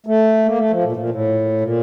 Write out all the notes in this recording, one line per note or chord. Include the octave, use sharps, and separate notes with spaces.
A3
A#3
A3
F3
A#2
A2
A#2
A2
A#2